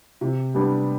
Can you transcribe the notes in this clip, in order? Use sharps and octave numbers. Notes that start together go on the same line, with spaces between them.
C3
G3 B3 D4 G4